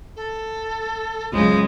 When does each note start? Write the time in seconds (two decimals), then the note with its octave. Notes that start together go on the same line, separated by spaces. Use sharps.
0.16 A4
1.33 C#2 F#2 C#3 G#3 C5